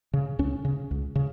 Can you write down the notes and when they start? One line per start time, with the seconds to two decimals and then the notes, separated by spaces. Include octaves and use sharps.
0.13 C#3
0.39 C#2 C#4
0.65 C#3
0.91 C#2
1.16 C#3